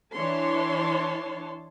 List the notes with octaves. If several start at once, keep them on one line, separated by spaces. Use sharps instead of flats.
E3 D4 C#5 A5 C6